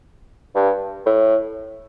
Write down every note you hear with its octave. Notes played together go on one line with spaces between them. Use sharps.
G2
A2